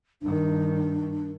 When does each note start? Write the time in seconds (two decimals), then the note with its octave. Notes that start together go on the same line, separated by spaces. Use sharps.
0.22 G2 D#3 D4